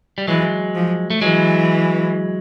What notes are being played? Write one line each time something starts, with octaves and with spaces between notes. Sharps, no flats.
G3
E3 F#3 G#3
F3
A3
E3 F#3 G#3